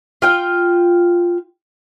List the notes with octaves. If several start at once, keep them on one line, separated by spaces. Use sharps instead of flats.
F4 G5